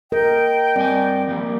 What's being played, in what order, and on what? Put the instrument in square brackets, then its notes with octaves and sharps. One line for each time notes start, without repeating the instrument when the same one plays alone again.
[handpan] A#4 [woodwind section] D#5 G5
[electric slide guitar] G2 G#5 [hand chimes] C4 D5
[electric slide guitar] F3 G3 A#3